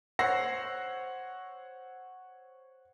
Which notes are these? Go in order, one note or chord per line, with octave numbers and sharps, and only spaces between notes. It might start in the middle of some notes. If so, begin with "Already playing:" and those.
C5 C#5 F#5 E6 A#6 C7